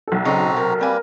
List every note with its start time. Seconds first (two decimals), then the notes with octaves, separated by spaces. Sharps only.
0.08 B1 A4
0.25 C#3 C4 D#4 F#4 A#5
0.57 C3 A#4
0.81 G3 A#3 C4 B4 G#5